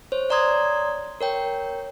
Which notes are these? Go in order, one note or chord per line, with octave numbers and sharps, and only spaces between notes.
C5 C#5
C#5 D5 A#5 C6 D#6 G#6
A#4 C#5 G5